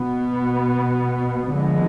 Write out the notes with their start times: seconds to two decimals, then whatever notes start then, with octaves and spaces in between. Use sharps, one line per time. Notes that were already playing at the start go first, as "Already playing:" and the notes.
Already playing: B2 B3
1.52 D3 F3 G#3 B3